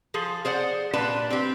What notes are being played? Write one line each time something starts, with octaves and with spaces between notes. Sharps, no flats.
F3 G#4 A4
G#4 C5 D5 F#5
A#2 G3 D4 B4 A5
C4 G4